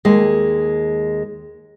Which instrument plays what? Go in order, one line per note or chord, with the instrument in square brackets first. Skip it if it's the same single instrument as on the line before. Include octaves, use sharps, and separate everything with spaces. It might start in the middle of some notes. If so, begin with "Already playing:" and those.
[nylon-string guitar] D#2 G#3